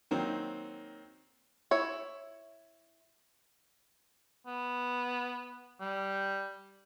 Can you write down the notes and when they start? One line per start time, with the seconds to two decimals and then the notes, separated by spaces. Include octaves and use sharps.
0.11 D#3 F#3 A#3 C4
1.71 E4 C#5
4.46 B3
5.81 G3